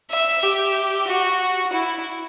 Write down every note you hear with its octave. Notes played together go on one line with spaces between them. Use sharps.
E5
G4
F#4
E4